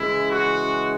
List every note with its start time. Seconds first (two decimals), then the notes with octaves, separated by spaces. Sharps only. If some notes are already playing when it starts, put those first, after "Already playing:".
Already playing: C#3 E3 G#3 E4
0.31 F#4